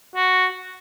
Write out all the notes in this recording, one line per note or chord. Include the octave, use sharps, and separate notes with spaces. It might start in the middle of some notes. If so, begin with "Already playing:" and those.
F#4